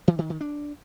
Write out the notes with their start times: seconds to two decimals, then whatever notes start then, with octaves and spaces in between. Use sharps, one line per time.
0.08 E3
0.19 D#3
0.30 D#3
0.41 D4